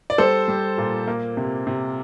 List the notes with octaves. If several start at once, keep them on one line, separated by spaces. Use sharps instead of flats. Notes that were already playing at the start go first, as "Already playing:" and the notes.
D5
G3 A4 C5
G3
A#2
A#3
C3
C3